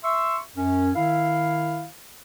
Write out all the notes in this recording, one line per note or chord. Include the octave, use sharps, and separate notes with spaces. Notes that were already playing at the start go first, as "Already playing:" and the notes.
E5 C6 C#6 E6
F#2 C#4
D#3 E4 F5